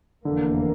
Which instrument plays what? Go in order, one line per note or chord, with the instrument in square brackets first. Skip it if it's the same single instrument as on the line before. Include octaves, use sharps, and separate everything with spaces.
[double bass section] F1 E2 E3 A#3 [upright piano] D3